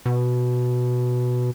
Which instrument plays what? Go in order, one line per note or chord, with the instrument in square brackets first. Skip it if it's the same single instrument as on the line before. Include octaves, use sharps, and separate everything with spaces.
[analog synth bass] B2